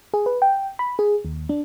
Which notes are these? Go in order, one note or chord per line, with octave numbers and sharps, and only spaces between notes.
G#4
B4
G5
B5
G#4
D#2
D4